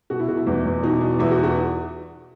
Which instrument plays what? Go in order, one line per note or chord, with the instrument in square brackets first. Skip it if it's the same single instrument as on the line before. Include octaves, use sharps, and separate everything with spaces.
[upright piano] B2 F#4
E4
B2 F#4
E4
E2 D#4
E2
B2 D#4
B2
E2 E4
F#4
F#4